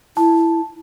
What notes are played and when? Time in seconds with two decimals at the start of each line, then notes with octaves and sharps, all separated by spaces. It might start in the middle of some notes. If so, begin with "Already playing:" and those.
0.17 E4 A5